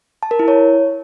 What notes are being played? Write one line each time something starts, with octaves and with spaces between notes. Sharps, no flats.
A5
A#4
E4
C#5